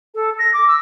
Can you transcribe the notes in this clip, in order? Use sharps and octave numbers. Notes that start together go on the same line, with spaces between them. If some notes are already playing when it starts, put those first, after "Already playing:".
A4
A#6
D6
E6